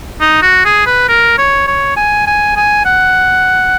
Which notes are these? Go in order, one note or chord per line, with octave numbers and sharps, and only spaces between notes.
D#4
F#4
G#4
B4
A#4
C#5
C#5
G#5
G#5
G#5
F#5